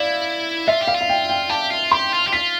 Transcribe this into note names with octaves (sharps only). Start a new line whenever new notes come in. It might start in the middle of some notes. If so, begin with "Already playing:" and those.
Already playing: E4 D5 F5
F4 E5
G4
F5
F4
F5
G5
G5
G4 A5
F4
G4 C6
F4
G4
F4 B6